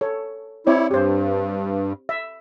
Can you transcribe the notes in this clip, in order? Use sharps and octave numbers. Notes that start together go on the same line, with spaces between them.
A4 C#5
C4 E4 C#5 D5
G2 G4 C5
E5